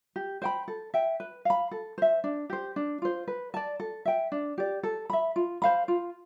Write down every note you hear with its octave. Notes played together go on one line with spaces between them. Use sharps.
G4
C5 G5 B5
A4
E5 G5
B4
F5 B5
A4
C5 E5
D4
G4 C5
D4
F4 C5
B4
D5 A5
A4
E5 G5
D4
G4 D5
A4
E5 B5
F4
C5 F5 B5
F4